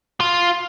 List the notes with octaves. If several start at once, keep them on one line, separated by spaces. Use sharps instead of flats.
F4